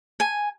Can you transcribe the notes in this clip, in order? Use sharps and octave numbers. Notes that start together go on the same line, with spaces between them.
G#5